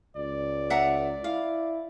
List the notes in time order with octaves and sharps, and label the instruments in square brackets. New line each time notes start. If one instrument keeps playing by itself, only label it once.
[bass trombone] C#2 [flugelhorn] D5
[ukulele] E5 F#5 A#5
[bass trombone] E4 [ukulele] F5